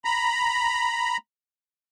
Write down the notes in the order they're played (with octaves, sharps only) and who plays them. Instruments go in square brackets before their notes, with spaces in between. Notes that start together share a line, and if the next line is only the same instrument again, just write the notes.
[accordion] A#5 B5